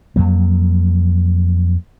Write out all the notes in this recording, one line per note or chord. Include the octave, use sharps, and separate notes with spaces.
F2 F#3 A#3